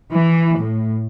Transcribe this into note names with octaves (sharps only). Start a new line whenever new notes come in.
E3
A2